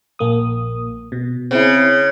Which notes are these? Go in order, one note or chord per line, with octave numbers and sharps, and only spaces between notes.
A#1 A#3 D#6
B2
C#3 C4 E4